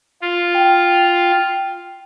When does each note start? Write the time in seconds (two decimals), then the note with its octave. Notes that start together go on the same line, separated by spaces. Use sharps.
0.22 F4
0.55 G5